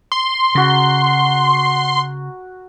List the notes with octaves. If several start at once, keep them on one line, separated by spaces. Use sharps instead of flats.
C6
C#3 F#4 A#4